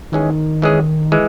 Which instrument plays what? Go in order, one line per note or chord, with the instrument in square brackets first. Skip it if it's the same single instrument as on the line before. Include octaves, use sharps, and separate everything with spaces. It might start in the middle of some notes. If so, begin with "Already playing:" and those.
[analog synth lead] D#3 [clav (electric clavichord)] E3 G#3 C#4 G#4
[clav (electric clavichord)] E3 G#3 C#4 G#4
E3 G#3